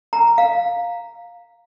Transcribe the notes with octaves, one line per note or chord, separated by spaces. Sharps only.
A#5
F5